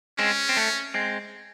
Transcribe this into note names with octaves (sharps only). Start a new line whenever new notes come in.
G#3 C4 C#4
C4
A3
G#3 C4